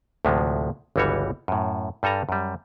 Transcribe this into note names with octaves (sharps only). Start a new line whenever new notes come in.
D2 A2 C3 F3 G#3
G1 C#2 E3 G3 F#4 C#5
F#2 A2
G2 G3 A4 G#5 A#5
F#2 G3